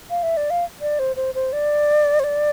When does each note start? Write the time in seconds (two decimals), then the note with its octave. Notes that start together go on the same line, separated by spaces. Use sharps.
0.10 F5
0.23 E5
0.37 D5
0.50 F5
0.81 D5
0.99 C5
1.16 C5
1.35 C5
1.53 D5
2.20 C5
2.24 D5